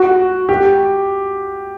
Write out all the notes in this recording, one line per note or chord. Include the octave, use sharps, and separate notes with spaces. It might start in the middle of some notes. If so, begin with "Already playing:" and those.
Already playing: F#4
G4